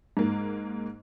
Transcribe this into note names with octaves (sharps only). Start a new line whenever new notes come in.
G#2 A#3